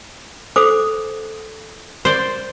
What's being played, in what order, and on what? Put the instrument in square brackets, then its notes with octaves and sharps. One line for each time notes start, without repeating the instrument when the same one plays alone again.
[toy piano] A4 C5 D6
[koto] C5 D5